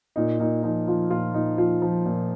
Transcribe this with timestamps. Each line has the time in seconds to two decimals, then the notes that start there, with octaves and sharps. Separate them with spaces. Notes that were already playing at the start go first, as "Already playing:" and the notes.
0.16 A#2 D#4
0.40 A#2 D#4
0.63 F3 D#4
0.88 F3 F4
1.10 A#2 F4
1.34 A#2 D#4
1.58 F3 F4
1.82 F3
2.05 A#2